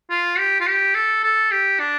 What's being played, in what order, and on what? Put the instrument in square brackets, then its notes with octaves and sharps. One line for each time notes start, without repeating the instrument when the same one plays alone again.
[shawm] F4
G4
F4
G4
A4
A4
G4
D4